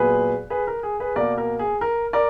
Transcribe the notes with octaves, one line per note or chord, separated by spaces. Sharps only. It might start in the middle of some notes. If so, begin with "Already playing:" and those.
Already playing: A#2 F#3 B3 G#4 B4
G#4 B4
A#4
G#4
G#4 B4
B2 A#3 A#4 D5
A#4
G#4
A#4
A#4 D5